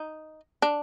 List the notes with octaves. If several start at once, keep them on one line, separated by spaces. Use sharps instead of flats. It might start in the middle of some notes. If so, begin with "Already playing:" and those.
Already playing: D#4
D4